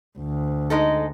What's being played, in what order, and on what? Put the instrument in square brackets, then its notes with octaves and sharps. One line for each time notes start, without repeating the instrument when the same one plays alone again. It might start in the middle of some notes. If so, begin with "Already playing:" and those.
[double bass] D2
[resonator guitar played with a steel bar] G#3 D#4 A4